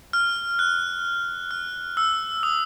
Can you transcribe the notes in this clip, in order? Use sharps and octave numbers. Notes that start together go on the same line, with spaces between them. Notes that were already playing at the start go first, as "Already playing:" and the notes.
F6
F#6
F6
E6
D#6